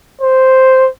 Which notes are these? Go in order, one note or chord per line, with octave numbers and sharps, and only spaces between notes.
C5